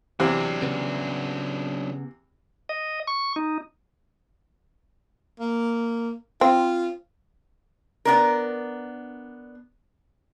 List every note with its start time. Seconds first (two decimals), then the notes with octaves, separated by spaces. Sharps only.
0.20 E2 C3 F#3 D4
0.62 C#3 B3
2.69 D#5
3.07 C#6
3.36 D#4
5.40 A#3
6.41 C4 F4
8.05 B3 D4 A#4